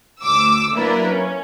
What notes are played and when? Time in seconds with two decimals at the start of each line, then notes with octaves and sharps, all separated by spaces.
0.22 D2 D6 E6
0.74 F#3 A#3 D4 E4 A#4 B4
1.08 C#4